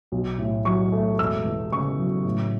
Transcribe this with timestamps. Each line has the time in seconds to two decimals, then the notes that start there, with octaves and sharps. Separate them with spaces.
0.12 B1
0.38 A2
0.65 F#3 C#6
0.92 A3
1.19 E1 E6
1.45 E2
1.72 C#3 C#6
1.98 F#3
2.25 A2